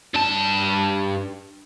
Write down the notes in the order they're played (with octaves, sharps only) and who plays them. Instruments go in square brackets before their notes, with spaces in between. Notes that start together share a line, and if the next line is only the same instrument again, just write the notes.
[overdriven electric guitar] G2 A5